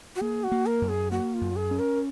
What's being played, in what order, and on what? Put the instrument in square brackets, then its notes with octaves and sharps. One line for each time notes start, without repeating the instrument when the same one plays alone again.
[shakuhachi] F#4
[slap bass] A#3 [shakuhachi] G#4
[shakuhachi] F#4
[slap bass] A#3
[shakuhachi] A#4
[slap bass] F#2
[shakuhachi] G#4
[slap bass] A#3 [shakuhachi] F#4
[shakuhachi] F4
[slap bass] F#2
[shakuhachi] G#4
[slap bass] C#4
[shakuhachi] A#4